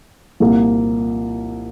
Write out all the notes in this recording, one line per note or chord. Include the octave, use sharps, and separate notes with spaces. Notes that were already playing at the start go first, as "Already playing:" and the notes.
C2 A#2 F3 A#3